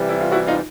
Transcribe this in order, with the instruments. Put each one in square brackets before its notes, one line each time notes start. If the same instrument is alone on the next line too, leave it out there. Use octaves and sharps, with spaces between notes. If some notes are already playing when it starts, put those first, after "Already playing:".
Already playing: [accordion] C3 E3 G3
[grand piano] E4
F4
E4 F#4
D#4 F4